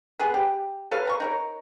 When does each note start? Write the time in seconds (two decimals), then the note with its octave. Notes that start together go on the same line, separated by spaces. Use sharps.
0.19 B3 G#4 B4
0.34 G4
0.91 A4 B4 C#5 F5
1.05 B4 A#5 C#6
1.20 D#4 A#4 C#5